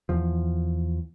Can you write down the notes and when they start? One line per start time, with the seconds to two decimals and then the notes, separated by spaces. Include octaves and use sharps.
0.09 E2 F3